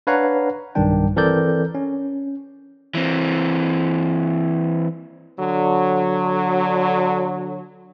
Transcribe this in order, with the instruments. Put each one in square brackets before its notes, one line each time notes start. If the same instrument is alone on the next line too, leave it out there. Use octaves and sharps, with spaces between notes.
[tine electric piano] D4 B4 C#5 F5 F#5 A#5
B1 G2 D#3 G3 D4 G5
E3 C4 A4 A#4 D5 G6
C#4
[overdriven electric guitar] E3 C4
[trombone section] D3 F#3